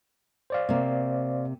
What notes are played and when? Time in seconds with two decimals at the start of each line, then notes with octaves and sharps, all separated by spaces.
0.50 C5 D5 F5
0.69 C3 A#3